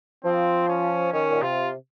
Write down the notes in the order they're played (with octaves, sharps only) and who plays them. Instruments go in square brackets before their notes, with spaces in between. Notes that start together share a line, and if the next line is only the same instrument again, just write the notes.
[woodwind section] F3 [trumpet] C4
[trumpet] C#4
[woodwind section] D#3 [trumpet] C#4
[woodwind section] A#2
[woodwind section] C3 [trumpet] F4